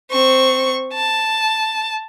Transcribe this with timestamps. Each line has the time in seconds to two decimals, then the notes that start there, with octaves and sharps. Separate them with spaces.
0.11 C4 C#6
0.93 A5